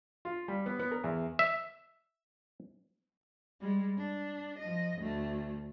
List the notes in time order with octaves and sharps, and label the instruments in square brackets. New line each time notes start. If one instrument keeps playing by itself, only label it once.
[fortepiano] F4
G3
B3
B3
A#4
E2
[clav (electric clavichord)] E5
[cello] G3 G#3
D4
F3 D#5
D2 A3